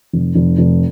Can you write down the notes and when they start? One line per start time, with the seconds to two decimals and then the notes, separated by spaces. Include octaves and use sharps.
0.13 F1
0.35 F1
0.58 F1